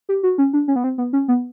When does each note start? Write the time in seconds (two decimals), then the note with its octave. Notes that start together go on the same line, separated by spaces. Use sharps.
0.09 G4
0.23 F#4
0.38 C#4
0.53 D4
0.68 C#4
0.76 B3
0.84 C4
0.98 B3
1.13 C#4
1.28 B3